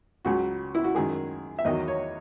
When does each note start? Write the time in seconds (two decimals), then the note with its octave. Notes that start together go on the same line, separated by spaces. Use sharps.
0.25 C#2 C#3 F#3 F#4
0.75 E4
0.84 F#4
0.95 F#2 D#3 G#3 G#4
1.59 E5
1.65 E2 D#3 F#3 D#5
1.88 C#5